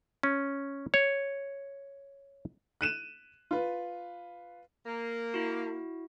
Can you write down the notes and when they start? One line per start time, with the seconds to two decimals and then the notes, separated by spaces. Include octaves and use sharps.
0.23 C#4
0.94 C#5
2.81 F#6 D#7 E7
3.51 F4 B4
4.86 A#3
5.34 E4 F#4